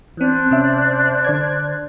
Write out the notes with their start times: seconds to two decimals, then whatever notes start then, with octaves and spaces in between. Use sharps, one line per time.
0.17 E3 C4 D4 C5 F#6
0.51 C3 C#4 E5
1.24 D3 D5 G#6